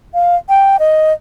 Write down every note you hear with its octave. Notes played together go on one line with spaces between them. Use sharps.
F5
G5
D#5